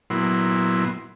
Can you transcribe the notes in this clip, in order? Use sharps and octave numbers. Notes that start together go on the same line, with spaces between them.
A#2 F#3 B3 E4 C6